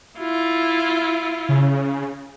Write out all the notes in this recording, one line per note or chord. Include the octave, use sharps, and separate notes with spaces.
E4 F4
C#3